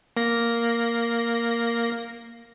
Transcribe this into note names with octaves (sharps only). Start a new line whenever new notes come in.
A#3 A#6